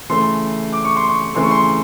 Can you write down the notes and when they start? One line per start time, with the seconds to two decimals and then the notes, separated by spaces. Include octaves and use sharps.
0.09 C#3 E3 A3 C6
0.73 D6
0.85 C#6
0.96 C6
1.09 C#6
1.34 C#3 E3 A3 C6
1.43 C#6
1.51 C6